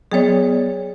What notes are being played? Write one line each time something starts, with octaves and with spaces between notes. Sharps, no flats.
F#3 B3 G#4 C#5 D5